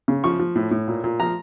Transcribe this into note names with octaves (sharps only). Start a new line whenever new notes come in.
C#3
F3 C#6
F3
A2
A2
A#2
A#2
F3 A#5